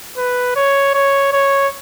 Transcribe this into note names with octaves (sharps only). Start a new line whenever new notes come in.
B4
C#5
C#5
C#5